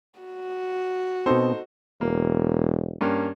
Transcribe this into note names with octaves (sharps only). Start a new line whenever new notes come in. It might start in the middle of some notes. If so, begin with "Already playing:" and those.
F#4
B2 C4 D#4 A4 C5
E1 A#3
G2 A#3 C#4